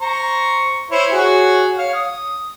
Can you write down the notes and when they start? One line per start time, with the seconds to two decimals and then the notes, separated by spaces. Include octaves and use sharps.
0.01 C5 A#5 C#6
0.91 E4 C5 C#5
1.12 F#4 G#4 C#5
1.78 C#5 F5
1.94 D#6